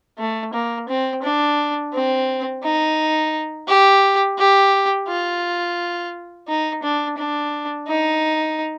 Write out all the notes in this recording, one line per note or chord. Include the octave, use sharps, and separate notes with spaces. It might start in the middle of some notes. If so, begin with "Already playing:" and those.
A3
A#3
C4
D4
C4
D#4
G4
G4
F4
D#4
D4
D4
D#4